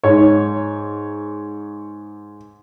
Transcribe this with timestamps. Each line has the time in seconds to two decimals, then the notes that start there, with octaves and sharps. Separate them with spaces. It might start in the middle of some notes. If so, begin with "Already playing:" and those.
0.04 G#2 C#5